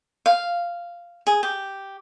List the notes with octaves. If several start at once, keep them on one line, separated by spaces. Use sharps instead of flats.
F5
G#4
G4